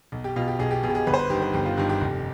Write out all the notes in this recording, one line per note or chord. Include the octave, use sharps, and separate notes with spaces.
B1
G4
B2 F4
G4
B1 G#4
G4
B2 G#4
G4
G#4
G1 B4
C5
B4
G2 D#3 G4
B4
G1 G4
F4
G2 D#3 G4
G4
F1